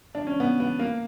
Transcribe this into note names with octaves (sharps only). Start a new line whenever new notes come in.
D4
C#4
B3
B3
A#3